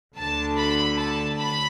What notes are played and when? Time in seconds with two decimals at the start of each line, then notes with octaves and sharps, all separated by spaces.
0.16 D2 D3 A5
0.57 B5
0.98 A5
1.38 B5